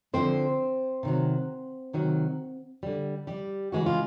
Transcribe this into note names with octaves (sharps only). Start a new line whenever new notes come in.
D3 F3 G#3 C4 C5
C3 D#3 F#3
C3 D#3 F#3
D3 G3
G3 G4
C#3 E3 G#3 F#4
F4